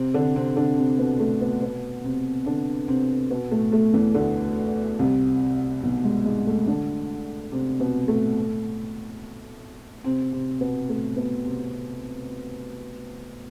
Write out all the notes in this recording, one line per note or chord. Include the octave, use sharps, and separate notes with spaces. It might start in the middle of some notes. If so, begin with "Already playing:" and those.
Already playing: C3 C4
D3 D4
C3 C4
D3 D4
C3 C4
B2 B3
A2 A3
B2 B3
B2 B3
C3 C4
D3 D4
C3 C4
B2 B3
A2 A3
A2 A3
E2 E3
D2 D3
C2 C3
B1 B2
G#2 G#3
G#2 G#3
A2 A3
D3 D4
C3 C4
B2 B3
A2 A3
C3 C4
C3 C4
B2 B3
A2 A3
B2 B3
C3 C4